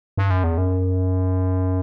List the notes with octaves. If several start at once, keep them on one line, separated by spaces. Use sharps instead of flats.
G2
F#2
E2
F#2